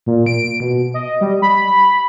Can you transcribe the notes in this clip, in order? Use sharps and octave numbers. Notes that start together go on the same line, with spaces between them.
A#2
D7
B2
D#5
G3
B5